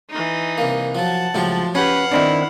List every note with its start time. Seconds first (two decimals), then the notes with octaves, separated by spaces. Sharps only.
0.11 E3 D#4
0.58 C2 A#3
0.95 F3 F#3 F#5 A5
1.34 C#2 A2 F3 F#3 G4
1.75 C#4 G4 B4 C#5 F5 F#5
2.11 D#3 C4 D4 E4